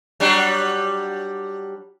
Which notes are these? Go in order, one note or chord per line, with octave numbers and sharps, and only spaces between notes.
F#3 G3 D4